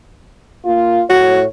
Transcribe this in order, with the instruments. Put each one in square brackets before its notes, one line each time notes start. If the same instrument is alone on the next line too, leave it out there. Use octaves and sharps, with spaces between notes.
[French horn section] A#3 F4
[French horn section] A2 C#5 [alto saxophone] F#4